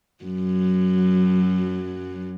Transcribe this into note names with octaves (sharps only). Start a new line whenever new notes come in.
F#2 F#3